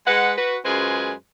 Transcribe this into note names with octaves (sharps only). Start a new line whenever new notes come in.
G#3 B4 F#5
F#4 B4
F#2 G#3 F4 G#4 B4 C5